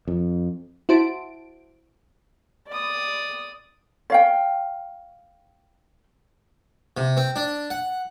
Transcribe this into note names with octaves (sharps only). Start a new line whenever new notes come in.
F2
E4 F#4 C5 A5 D7
D5 D#6
C#5 F5 G5
C3
C4
D4
F#5